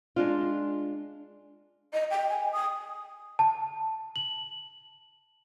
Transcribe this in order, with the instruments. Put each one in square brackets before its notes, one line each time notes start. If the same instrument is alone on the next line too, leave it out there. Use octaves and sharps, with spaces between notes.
[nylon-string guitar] G#3 D4 F4
[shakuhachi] D#5
G5
G#5
D#6
[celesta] A5
F#7